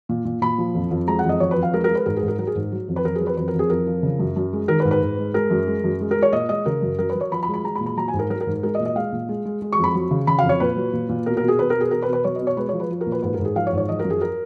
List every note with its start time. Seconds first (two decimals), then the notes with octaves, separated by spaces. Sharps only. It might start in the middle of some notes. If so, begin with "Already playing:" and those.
0.09 A#2
0.25 A#2
0.41 A#2 B5
0.58 F3
0.75 F2
0.91 F2
1.07 G#3 A#5
1.19 F#5
1.24 F2 D#5
1.40 F2 C#5
1.51 B4
1.56 F2
1.63 F5
1.73 G#3 A#4
1.84 A#4
1.90 G#3
1.95 B4
2.06 G#2 A#4
2.17 G#4
2.23 G#2
2.28 A#4
2.39 F#3 A#4
2.47 G#4
2.55 G#2
2.72 F#3
2.88 F2
2.96 B4
3.04 F2 A#4
3.15 G#4
3.21 F#3
3.27 B4
3.37 F2 B4
3.48 A#4
3.54 F2 G#4
3.70 F2 A#4
3.87 F3
4.03 C#3
4.19 F#2
4.36 F#2
4.53 G#3
4.68 D#3 A#4
4.80 B4
4.85 G#2
4.91 B4
5.02 G#2
5.18 G#3
5.34 G#3 A#4
5.51 F#2
5.67 G#3
5.84 F#2
6.01 G#3
6.11 A#4
6.17 G#3
6.22 C#5
6.33 A#2 D#5
6.49 G#3 D#5
6.66 C#3 A#4
6.82 F#2
6.99 F#3 A#4
7.10 B4
7.15 F#3
7.21 C#5
7.32 F3 B5
7.43 B5
7.48 G#3
7.54 B5
7.64 G#3 A#5
7.75 B5
7.81 A#2
7.86 B5
7.97 F#3 A#5
8.08 G#5
8.14 G#2
8.19 A#4
8.30 F#3 A#4
8.41 A#4
8.47 G#2
8.63 G#3 A#4
8.75 D#5
8.80 A#2
8.86 D#5
8.95 G#3 F5
9.12 A#2
9.29 G#3
9.45 G#3
9.62 G#3
9.72 C#6
9.78 F2
9.84 B5
9.95 F#3
10.11 C#3
10.27 C#3 B5
10.39 F2 F5
10.49 C#5
10.60 A#2 B4
10.76 F#3
10.93 A#2
11.09 A#2
11.26 B2 A#4
11.37 A#4
11.42 B2
11.48 G#4
11.59 B2 B4
11.70 A#4
11.75 B2
11.80 G#4
11.91 B2 A#4
12.02 B4
12.08 B2
12.13 B4
12.24 F#3 C#5
12.35 D#5
12.41 B2
12.47 C#5
12.57 G#3 B4
12.69 F3 C#5
12.80 B4
12.90 F3
13.01 A#4
13.07 A#2
13.12 B4
13.22 G#2 B4
13.34 A#4
13.39 G#2
13.45 G#4
13.56 F3 F5
13.67 C#5
13.73 G#2
13.78 C#5
13.89 F3 D#5
13.99 A#4
14.05 F#2
14.10 G#4
14.22 A#4